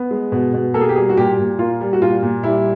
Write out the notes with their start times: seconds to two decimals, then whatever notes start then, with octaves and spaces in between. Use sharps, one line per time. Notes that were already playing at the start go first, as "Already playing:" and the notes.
Already playing: B3
0.11 G#3
0.32 B2
0.54 B2
0.74 A#3 A4
0.81 G#4
0.89 G4
0.96 G3 G#4
1.10 F#4
1.17 A#2 G4
1.39 A#2
1.59 A#3 F4
1.81 G3
1.93 F#4
2.02 A#2 F4
2.23 A#2
2.44 G3 E4